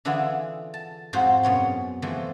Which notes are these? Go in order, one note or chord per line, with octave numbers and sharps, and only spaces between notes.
D3 E3 D4 E4 F4 G#4
A5
F2 G#2 F4 F#4 G#4 C5
F#2 B2 C#5 C6
E3 F3 G#3 A3